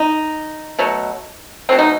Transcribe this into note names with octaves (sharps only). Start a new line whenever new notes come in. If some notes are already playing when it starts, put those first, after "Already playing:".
Already playing: D#4
B2 F#3 A3
B2 F#3 A3 C4
D#4